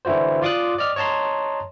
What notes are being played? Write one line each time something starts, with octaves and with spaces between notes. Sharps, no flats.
D3 E3 E4 F#4 C5
F4 D5 C6 D6 D#6 F#6
D5 D#5 F6
C#5 D#5 A5 A#5 C6